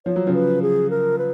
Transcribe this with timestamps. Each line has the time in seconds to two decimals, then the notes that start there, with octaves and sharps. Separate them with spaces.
0.06 F3 C#5
0.16 F#3
0.27 C#3 F3
0.34 B4
0.62 G#4
0.90 A#4
1.18 B4